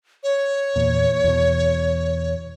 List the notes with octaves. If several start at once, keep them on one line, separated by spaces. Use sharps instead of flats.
C#5
E2 A#2
E2 B2